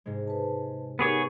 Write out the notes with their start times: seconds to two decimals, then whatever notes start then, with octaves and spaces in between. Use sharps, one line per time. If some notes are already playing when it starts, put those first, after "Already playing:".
0.06 G#2 C3 G#3
0.28 B4 A5
0.99 B3 D#4 G4 G#4 A#4 C#5